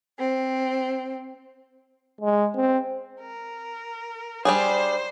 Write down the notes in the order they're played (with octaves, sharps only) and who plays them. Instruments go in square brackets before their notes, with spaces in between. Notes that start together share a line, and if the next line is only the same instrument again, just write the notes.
[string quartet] C4
[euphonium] G#3
C4
[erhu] A#4
[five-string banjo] G3 D4 G#4 [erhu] C5